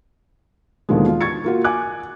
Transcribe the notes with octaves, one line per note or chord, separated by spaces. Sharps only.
D#2 B2 D3 D#3 F3 G#3
F4
C#6 G#6 A6 C#7
A#3 F4 F#4
G#5 D6 F#6